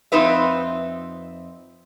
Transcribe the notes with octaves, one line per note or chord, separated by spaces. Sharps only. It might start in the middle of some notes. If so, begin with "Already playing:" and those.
F2 C4 D#4 B4 E5